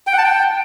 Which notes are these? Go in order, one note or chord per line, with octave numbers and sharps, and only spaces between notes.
G5
F#5
A5
G5